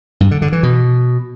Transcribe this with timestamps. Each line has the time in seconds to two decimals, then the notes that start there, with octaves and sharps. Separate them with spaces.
0.20 G2
0.31 D3
0.42 D3
0.52 E3
0.63 B2